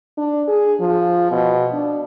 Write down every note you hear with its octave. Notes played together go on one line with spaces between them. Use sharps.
D4
G#4
F3
B2
D4